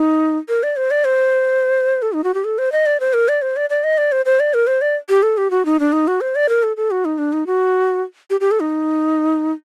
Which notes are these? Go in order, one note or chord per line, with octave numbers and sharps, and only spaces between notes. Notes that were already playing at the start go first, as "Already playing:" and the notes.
Already playing: D#4
A#4
D5
C5
D5
C5
A4
D#4
F#4
G4
A4
C5
D#5
D5
C5
A#4
D5
C5
D5
D5
D#5
D5
C5
C5
D5
A#4
C5
D5
G4
A4
G4
F#4
D#4
D4
D#4
F#4
C5
D5
A#4
A4
A4
F#4
D#4
D4
D#4
F#4
G4
G4
A4
D#4